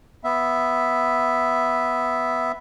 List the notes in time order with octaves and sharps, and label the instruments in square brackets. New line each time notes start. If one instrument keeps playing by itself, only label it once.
[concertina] B3 E5